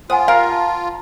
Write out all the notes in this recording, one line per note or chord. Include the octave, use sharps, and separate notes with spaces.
F4 C5 F#5 G#5 D#6
A#4 F5
A5